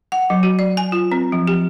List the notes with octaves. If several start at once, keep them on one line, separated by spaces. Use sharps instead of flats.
F#5
F#3
F#4
D5
G#5
F4
C4
F3
G4